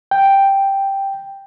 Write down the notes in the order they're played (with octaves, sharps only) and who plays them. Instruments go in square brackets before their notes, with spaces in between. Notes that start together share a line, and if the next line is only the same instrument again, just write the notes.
[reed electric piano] G5